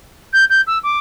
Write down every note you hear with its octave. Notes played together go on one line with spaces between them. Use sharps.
G6
G6
E6
D6